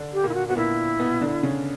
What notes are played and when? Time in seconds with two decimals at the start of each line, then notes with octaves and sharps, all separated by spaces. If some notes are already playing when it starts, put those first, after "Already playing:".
Already playing: D3 D4
0.13 G4
0.24 A#2 A#3 E4
0.34 F#4
0.48 B3 F#4
0.56 A#2 A#3 E4
0.99 B2 B3
1.21 D3 D4
1.43 C#3 C#4